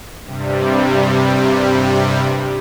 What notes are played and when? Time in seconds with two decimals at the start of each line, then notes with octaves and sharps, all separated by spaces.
0.23 G2 C3 G3